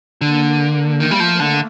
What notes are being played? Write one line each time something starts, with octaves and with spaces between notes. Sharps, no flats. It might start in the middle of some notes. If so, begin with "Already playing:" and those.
D3 A#3
D#3 A3
G3
F3
D3